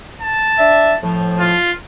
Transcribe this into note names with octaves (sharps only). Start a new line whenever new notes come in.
A5
D4 E5
A2 F3
F4